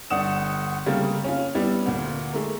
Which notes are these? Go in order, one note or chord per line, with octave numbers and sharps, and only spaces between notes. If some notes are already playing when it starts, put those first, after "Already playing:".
G1 D4 F#5 D#6 E7
C#3 G3 A3 A#3 C4
C#4 F4
G3 B3 D4 E4
D2 A#2
G#3 A3 A#4